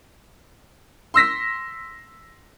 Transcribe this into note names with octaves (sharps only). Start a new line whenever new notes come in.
C6 E6 A#6 B6